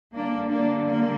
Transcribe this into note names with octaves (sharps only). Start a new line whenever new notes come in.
D3 G3 A#3 D4
A#3 D4
A#3